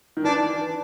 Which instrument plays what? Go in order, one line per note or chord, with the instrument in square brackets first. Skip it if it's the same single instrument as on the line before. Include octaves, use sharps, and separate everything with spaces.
[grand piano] D#3
[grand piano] E3 [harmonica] D4